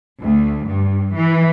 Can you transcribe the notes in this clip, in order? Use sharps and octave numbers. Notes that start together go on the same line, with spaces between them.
D2
G2
E3